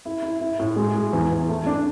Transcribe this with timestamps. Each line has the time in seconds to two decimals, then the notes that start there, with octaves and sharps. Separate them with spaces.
0.05 E4
0.22 E4
0.41 E4
0.60 A2
0.76 G#3
0.95 G#3
1.13 E2
1.31 E2
1.49 A3
1.67 D4